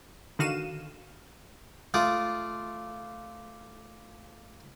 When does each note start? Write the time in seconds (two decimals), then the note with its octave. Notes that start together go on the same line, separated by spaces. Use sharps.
0.39 D3 D#3 F#4 F5 D#7 E7
1.94 A3 F4 D5 D#6